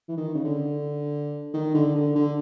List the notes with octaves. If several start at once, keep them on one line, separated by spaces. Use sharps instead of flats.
E3
D#3
C#3
D3
D#3
D3
D3
D3